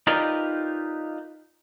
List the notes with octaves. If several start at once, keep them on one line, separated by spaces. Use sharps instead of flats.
D#4 F4 G4 A#4 B4 D5